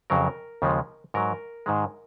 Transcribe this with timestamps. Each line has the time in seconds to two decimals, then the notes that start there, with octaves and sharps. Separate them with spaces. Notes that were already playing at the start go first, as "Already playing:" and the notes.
0.10 F2 C#3 F#3 A#4
0.62 D#2 C#3 F3 G#3
1.14 G#2 F#3 A#4
1.66 G#2 D#3 G#3